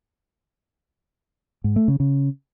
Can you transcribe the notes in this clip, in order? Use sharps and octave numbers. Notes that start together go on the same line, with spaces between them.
G#2
A3
C#3
C#3